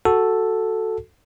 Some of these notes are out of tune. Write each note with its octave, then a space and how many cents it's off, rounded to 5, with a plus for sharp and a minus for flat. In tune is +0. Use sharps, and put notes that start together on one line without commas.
F#4 +0 A4 +0